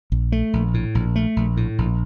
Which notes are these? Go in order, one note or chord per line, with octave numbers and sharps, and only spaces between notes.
A#1
A3
A#1
A2
A#1
A3
A#1
A2
A#1